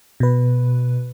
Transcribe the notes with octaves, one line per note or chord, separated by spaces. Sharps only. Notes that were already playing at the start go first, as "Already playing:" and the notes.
B2 B4